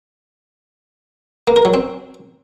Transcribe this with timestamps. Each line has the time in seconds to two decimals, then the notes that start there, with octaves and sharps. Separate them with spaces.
1.48 A#3
1.56 A#4
1.65 F#3
1.74 C4